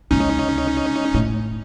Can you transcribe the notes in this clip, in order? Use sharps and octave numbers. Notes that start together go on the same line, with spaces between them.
C#2 C3 C#4 D#4
A2